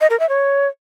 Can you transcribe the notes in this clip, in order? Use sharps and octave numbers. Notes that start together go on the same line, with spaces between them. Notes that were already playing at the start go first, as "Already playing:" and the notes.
D#5
A#4
E5
C#5